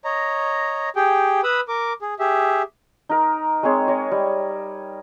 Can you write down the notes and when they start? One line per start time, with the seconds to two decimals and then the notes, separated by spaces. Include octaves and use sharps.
0.05 C#5 D#5 A#5
0.96 G4 G#4 G5
1.44 B4 B5 D#6 E6
1.68 A#4 D6
2.02 G#4
2.19 G4 G#4 E5
3.09 D#4 A#4
3.63 G#3 C4 G#4 C#5
3.88 C#5 D#5
4.11 G3